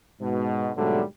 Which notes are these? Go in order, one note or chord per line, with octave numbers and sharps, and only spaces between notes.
G#2 B2
G#2 B2 D3 F#3 G3 A3